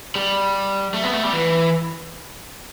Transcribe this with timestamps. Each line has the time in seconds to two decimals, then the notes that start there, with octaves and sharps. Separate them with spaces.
0.15 G3
0.94 A3
1.03 B3
1.14 A3
1.23 G3
1.33 E3